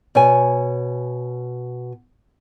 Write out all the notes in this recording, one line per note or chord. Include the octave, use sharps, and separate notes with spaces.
B2 C#5 G#5